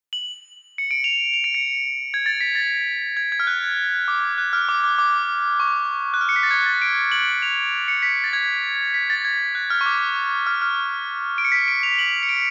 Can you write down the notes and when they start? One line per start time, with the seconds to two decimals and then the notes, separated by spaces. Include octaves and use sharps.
0.13 F#7
0.78 C#7
0.91 D7
1.04 F7
1.34 F7
1.44 D7
1.55 C#7
2.14 G#6
2.26 A6
2.41 B6
2.55 A6
3.17 G#6
3.32 G#6
3.40 F6
3.47 F#6
4.08 D6
4.38 F#6
4.53 F6
4.69 D6
4.84 D6
4.99 D6
5.60 C#6
6.14 F#6
6.21 F6
6.29 C#7
6.36 B6
6.43 A6
6.51 G#6
6.66 A6
6.82 D7
7.12 F#7
7.42 F7
7.88 C#7
8.03 B6
8.24 A6
8.33 G#6
8.94 B6
9.10 A6
9.25 G#6
9.55 F#6
9.70 F6
9.81 C#6
9.86 D6
10.47 F6
10.62 F6
11.38 D7
11.45 C#7
11.52 B6
11.59 C#7
11.68 D7
11.83 F7
11.99 F#7
12.23 C#7
12.29 D7